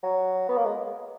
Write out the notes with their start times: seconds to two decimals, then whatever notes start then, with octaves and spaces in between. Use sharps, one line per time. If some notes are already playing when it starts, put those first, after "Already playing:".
0.03 F#3
0.49 B3
0.57 A#3
0.65 G#3